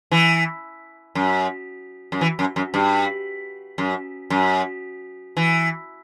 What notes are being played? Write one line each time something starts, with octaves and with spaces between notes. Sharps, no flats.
E3
F#2
F#2
E3
F#2
F#2
G2
F#2
F#2
E3